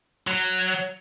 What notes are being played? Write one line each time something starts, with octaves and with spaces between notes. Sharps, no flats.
F#3